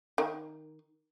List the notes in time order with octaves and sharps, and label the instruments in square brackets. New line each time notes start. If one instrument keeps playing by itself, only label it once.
[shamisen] D#3